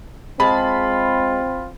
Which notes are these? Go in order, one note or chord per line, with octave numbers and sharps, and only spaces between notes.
G#3 C4 F4 G#4 A5 B5